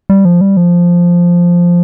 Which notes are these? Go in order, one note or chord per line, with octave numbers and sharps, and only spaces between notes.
G3
F3
G3
F3